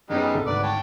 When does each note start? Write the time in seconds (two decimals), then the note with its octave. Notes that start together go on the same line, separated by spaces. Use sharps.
0.10 F#2 G3 G#3 B3 C#4 D#4
0.34 C2 A4
0.46 G#1 D2 B4 D5
0.63 C#5 G5 A5